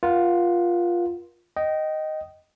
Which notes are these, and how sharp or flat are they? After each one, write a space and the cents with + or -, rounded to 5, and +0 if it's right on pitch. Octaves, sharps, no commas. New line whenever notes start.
F4 +0 A#4 +40 F#5 +0
D#5 +0 G5 -25